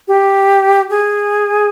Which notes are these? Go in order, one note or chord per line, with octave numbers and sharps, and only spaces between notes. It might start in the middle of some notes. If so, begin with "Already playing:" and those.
G4
G#4